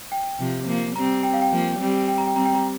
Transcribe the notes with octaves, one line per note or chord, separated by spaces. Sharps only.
G5
C3 F3
F3 A#3
G3 C4 A#5
G5
F5
G5
F3 A#3
G3 C4
G5
A#5
G5
G3 C4 A#5
G5
A#5